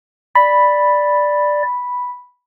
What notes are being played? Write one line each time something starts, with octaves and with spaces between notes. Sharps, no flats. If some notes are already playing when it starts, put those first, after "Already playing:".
D5 B5